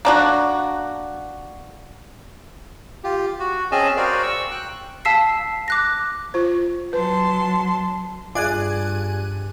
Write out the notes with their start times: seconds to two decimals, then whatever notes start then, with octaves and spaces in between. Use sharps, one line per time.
0.05 A#3 D4 F#4
3.04 F4 G4
3.40 F#4
3.72 C4 C#4 G#4 D#5 G#5 A5
3.97 F#4 A#4 C5 D5 F5 G5
4.23 C#6 E6
4.51 G5 F#6
5.05 F5 A5 E6 B6 C7
5.68 D6 F#6 A#6
6.34 F4 C5
6.93 F#3 B4 A5 C6
8.35 G2 F4 G#4 D5 G#5 D6 F#6 G#6